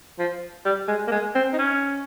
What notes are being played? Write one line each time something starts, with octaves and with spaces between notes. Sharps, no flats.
F3
G3
G#3
A#3
G#3
C4
D#4
C#4